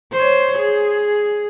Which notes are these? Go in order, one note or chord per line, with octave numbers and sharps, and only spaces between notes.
C5 C#5
G#4